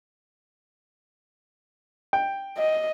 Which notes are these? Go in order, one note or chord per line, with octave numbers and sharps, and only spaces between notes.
G5
D#5